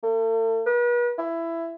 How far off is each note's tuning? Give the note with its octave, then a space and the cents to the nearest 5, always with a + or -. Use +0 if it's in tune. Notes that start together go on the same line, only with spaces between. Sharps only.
A3 +40
B4 -40
E4 +15